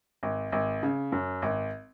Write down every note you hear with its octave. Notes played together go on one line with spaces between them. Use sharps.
G#1
G#1
C#3
F#2
G#1